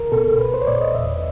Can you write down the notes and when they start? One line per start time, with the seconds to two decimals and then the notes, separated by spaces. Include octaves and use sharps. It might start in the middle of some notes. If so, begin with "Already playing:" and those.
Already playing: C#2 A#4
0.12 B2 A4
0.40 C2 B4
0.54 C5
0.62 C#5
0.67 A#2 D5
0.81 D#5
0.95 E2 E5